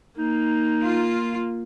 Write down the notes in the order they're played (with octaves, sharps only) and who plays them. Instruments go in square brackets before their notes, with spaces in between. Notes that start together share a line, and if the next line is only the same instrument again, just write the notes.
[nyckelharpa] A#3 [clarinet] D#4
[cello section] F4